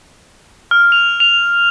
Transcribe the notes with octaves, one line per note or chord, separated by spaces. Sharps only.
F6
F7
F7